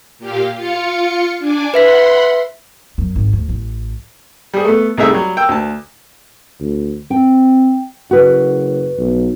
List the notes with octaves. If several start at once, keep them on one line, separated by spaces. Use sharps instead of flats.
A#2 G4 F5
F4 F5 C#7
D4 G#5 D6
B4 E5 F#5 B5 C6 B6
F#2
G#1
D2
A1
G3 G#4
A3 B3
C2 A3 A#3 D#4 G#4 E5
F#3 G3
G5 E6
D2 A5
D2
C4 G5
F#1 F#4 B4
B1